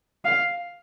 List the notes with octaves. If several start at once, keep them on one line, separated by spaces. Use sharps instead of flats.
F5